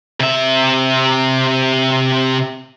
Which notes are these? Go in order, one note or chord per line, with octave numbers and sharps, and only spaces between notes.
C3 E5